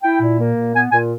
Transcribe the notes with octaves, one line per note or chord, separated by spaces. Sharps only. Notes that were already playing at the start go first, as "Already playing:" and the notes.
E4 G5
A#2
A#3
A#2
B3 G#5
A#2 G#5